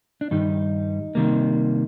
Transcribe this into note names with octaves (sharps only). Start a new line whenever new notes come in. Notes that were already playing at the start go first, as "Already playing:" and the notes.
D4
G2 D#3 G3 D#4
C3 D#3 G3 A#3